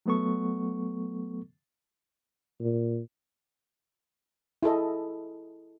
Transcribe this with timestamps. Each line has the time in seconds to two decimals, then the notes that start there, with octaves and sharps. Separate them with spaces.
0.06 F#3 A3 B3 A4 C#6
2.60 A#2
4.63 E4 G#4 A4 D#5